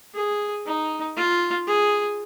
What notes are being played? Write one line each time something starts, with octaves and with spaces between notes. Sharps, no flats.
G#4
D#4
F4
G#4